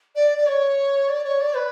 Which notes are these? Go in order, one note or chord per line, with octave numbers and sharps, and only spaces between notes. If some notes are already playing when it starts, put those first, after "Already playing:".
D5
D5
C#5
D5
C#5
D5
B4